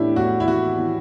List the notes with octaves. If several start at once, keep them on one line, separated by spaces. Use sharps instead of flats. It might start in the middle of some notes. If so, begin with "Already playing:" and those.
Already playing: A2 E3 D4 E4 G4
A2 F#4
E4
E3 F#4
E3